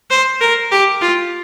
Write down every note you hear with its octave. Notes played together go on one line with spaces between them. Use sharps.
C5
A#4
G4
F4